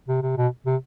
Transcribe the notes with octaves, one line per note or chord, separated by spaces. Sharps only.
C3
C3
B2
C3